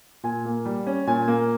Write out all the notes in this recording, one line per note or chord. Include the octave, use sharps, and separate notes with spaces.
A#2 G#5
A#3
G3
C#4
A#2 G#5
A#3